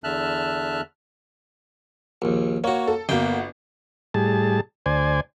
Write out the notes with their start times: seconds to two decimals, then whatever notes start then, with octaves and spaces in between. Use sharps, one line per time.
0.04 E2 D3 E5 A5 F6 F#6
2.22 A#1 D#2
2.64 A#3 F#4 C#5
2.87 A4
3.09 G1 A#3 B3 F#4 G5
4.14 A2 G3 G#4 A5
4.86 D2 C5 D5 G#5